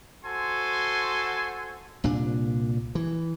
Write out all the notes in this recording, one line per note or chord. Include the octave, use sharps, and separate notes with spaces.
F#4 A4 C5 G#5 C6
C2 A#2 D4
E3